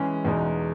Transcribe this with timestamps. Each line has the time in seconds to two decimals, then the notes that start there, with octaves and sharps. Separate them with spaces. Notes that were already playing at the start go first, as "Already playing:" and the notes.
Already playing: E3 G#3 C#4 G#4
0.25 E2 B2 G#3 D#4